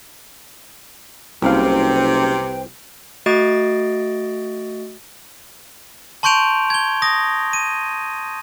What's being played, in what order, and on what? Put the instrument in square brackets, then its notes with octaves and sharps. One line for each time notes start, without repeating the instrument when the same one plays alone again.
[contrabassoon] F#1 [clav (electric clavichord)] C2 F5 [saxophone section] C3 [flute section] B4 C5 G5
[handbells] A3 F#4 D#5 A6 D7
[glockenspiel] A5 C6 C#6 G6 D7 F7
G#6 G7
D#6 A#6
D#7